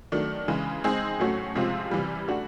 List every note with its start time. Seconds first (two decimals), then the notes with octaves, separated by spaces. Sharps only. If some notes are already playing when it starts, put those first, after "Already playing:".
0.12 D#3 F#3 A3 D4
0.48 C#3 E3 G#3
0.84 G#3 C4 D#4 G#4
1.19 A2 F#3 A3 C#4 F#4
1.55 C3 F3 G#3 C4 F4
1.91 C3 E3 G3
2.28 A3 D4 F#4